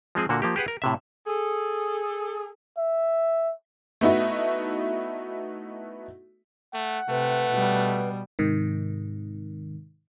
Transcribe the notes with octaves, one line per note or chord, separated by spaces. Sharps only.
F3 G#3 C4 G#4
A#2 D3 A#3 F#4
F3 A#3 G4
G4 G#4 B4 F#5
A#4
A2 C3 E5
G#4 A4
E5
A3 B3 D#4 E4 F#4
A3 F#5
C3 A3 B4
B2 G3
G#2 C3 D#3